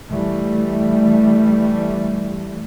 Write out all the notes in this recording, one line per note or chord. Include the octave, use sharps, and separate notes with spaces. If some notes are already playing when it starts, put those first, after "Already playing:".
E3 G3 A3